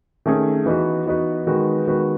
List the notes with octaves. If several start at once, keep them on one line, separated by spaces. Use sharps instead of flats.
D#3 A3 C#4 G#4
E3 B3 D#4 F#4 B4
E3 B3 D#4 F#4 B4
D#3 G#3 B3 F#4 B4
D#3 G#3 B3 F#4 B4